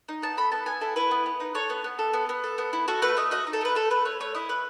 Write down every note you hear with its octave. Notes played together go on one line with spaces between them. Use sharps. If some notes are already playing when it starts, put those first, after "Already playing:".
D#4
B3 A5
A4 B5
B3 A5
B3 G#5
E4 A4
E4 B4
B3
B3
D#4
A4 C#5
B3
B3
A4
B3
B3
A4
B3
E4
F#4 A4
A3 B4
A3 D#5
F#4 D#5
D#4
A4
A3 B4
A3 A4
A3 B4
A3 C#5
A3 C#5
E4 D#5
A3 B4